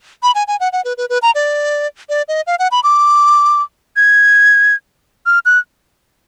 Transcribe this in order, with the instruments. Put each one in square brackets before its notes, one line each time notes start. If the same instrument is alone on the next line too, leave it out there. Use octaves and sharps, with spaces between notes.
[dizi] B5
G#5
G#5
F#5
F#5
B4
B4
B4
A#5
D5
D5
D#5
F5
F#5
B5
D6
G#6
F6
F#6